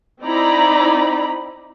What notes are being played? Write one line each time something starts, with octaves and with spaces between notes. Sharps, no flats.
C4 D#4 E4 D5 A#5 B5